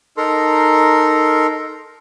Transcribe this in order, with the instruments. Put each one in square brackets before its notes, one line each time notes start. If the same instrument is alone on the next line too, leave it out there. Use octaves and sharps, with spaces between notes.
[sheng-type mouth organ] D#4 A4 A#4 A#5 C6